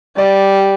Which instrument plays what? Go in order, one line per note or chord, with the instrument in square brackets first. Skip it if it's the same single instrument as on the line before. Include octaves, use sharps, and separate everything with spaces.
[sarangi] G3 [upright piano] D5